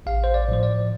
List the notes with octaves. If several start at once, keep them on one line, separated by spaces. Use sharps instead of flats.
A1 F5
C5
D5
A2 F3 C5
D5